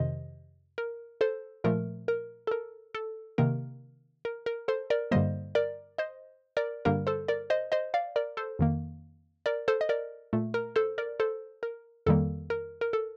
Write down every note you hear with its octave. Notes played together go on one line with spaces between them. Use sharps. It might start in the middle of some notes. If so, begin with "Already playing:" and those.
Already playing: F2 C3 D#3 C5 D#5
A#4
A4 C5
A#2 F3 A3 A#4
A#4
A4
A#4
A4
C3 D#3 A#3 A#4
A#4
A#4
A4 C5
A#4 D5
G2 D3 G3 A#3 C5 D#5
A#4 D5
C5 D#5
A#4 D5
G2 D3 G3 A#3 A#4
A4 C5
A#4 D5
C5 D#5
C5 D#5
D5 F5
A#4 D5
A4 C5
F2 D#3 A#3
A#4 D5
A4 C5
D#5
A#4 D5
A#2 A3
A#4
A4 C5
A#4 D5
A4 C5
A#4
F2 D#3 G3 A#3 A4
A#4
A#4
A4